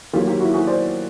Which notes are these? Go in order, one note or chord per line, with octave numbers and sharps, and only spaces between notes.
D#3 F#3 A#3 F4 G4
F4 G4
E4 F#4
F#4 G#4
C5 D5